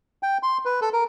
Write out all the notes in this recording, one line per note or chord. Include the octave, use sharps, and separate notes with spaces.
G5
C6
B4
A4
A#4